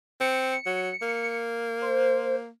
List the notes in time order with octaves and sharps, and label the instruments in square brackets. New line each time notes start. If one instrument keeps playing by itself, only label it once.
[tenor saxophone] C4 [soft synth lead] C#7
[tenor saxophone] F#3
A#3
[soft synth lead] C5